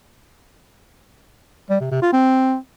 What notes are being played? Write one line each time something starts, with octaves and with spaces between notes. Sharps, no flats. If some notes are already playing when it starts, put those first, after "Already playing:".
G3
C3
C3
F4
C4